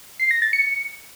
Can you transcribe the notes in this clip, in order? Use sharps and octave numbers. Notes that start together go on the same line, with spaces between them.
C7
A#6
A6
C#7